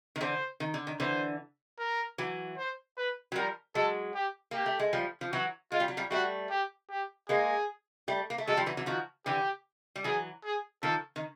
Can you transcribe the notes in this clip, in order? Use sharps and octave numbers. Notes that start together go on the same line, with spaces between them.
D#3
D3 E3 C5
D#3
D3
D#3
D3 E3 C5
A#4
E3 F#3
C5
B4
F#3
F3 G3 A#4
F#3 G#3 A4
G4
A#3 G4
A3
G#3
F3 G3
F3
E3 F#3 F#4
G#3 F4
G3
F#3
F3 G3
G3 A3 F#4
G4
G4
G#3 A#3 G#4
G3 A3
A#3
A3
F#3 G#3 A4
F3 G3
E3 F#3
E3 F#3
D#3 F3 F#4
D3 E3 G4
G3
E3 F#3 G#4
G#4
D#3 F3 A4
D#3